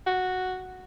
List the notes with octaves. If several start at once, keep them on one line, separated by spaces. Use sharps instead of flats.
F#4